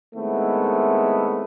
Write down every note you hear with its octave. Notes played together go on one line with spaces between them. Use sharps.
D#3 G#3 A3 B3 C4 E4